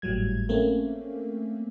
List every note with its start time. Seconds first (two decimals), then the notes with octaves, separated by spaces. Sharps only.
0.02 G#1 A2 F#3 G3 G#6
0.49 A3 A#3 C4 C#4